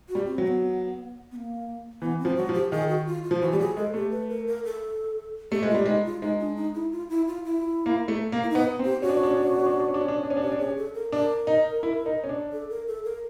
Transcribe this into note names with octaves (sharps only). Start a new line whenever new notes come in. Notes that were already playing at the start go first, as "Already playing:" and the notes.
F#4
G3
C4
F#3
C4
B3
B3
A#3
E3 B3
C4
F3
F#3 F#4
F3
G4
D#3 G#4
F#4
F4
F4
F3
E3 F#4
G3 G4
F#3 G#4
G#3 A4
A3 G4
B4
A#4
A#4
A4
A3 G4
G#3
F4
G3
G#3 D#4
F4
G#3 D#4
D4
D#4
E4
F4
E4
F4
E4
A#3
A3
A#3
E4
D#4
B3
C4
G4
C#4 F#4
D4
C#4
D4
C#4
D4
C#4
D4
C#4
D4
C#4
D4
C#4
D4
C#4
D4
C#4
D4
C#4
D4
C#4 G4
D4
C#4 G#4
A4
A#4
D4 A#4
D#4
E4
D#4
C#4
D4
A4
A#4
A4
A#4